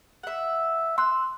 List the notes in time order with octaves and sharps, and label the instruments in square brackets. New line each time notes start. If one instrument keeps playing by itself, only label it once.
[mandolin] E5 F#5
[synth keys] C6 F#6 [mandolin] E6